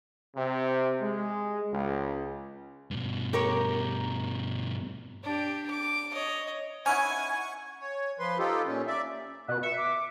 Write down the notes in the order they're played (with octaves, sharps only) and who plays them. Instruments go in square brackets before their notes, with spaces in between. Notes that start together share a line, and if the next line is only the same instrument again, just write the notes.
[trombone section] C3
G#3
C#2
[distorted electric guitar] G2 B2
[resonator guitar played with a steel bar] G4 A#4 C#5
[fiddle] D4 G4
D6
C#5 D#5
[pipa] C#4 D#4 E4 [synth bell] F#5 C#6 G#6 [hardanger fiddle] G#5
[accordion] C#5
F3 B4 C6
D#4 F4 G4 A4
A#2 C#4
D5 E5
[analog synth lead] B2 [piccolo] F#6
[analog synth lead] E5 [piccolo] C#7
[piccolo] D6